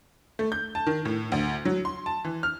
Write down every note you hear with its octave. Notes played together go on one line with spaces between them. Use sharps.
A3
G6
A5
D#3
A2
D2
F#3
C6
A5
E3
F6